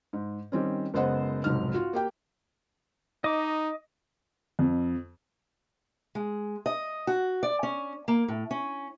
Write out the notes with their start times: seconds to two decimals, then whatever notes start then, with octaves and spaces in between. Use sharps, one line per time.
0.13 G#2
0.52 D#3 G3 C4 C#4
0.94 F#1 G#3 B3 C5 D#5 F#5
1.44 F1 B1 G#2 F6
1.74 F4 F#4
1.93 A#3 G4 G5
3.24 D#4 D#5 D6
4.59 F2
6.15 G#3
6.66 D#5
7.07 F#4
7.43 D5
7.63 C#4
8.08 A#3
8.28 A2
8.51 C#4